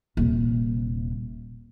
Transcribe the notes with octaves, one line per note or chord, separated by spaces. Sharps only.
D#1 C3